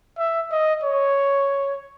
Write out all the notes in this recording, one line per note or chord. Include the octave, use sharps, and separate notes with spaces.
E5
D#5
C#5